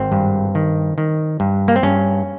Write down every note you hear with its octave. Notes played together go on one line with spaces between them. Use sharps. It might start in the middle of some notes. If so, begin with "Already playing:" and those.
Already playing: G#1 C4
G2
D#3
D#3
G2
A#3
C4
G2 C#4